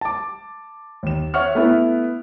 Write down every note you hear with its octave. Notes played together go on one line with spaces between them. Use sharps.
A5 D6
D#2 E7
C#5 E5 F#5 C#6 F6
A3 B3 E4 B4